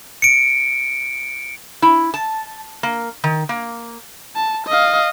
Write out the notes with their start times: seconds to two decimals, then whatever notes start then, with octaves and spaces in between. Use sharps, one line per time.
0.22 C#7 D7
1.82 E4
2.14 A5
2.83 A#3
3.24 D#3
3.49 A#3
4.36 A5
4.67 D#5 F5